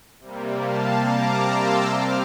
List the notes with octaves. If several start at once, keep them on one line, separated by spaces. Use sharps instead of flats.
C3 G3 A#3
F5 A5
A#5 D6
C6 E6
C3 G3 C4 D6 F6